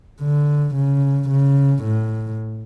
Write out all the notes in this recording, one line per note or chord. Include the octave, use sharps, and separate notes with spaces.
D3
C#3
C#3
A2